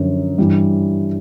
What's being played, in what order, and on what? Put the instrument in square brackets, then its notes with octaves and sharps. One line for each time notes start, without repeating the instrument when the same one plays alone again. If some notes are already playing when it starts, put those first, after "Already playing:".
Already playing: [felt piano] F#2 D3 F3
G2 E3 G3